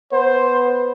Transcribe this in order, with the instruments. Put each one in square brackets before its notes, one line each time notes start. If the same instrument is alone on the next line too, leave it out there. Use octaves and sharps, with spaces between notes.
[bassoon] B3 [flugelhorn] C5